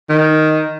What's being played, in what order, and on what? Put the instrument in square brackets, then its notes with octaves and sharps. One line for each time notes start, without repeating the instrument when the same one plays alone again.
[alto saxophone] D#3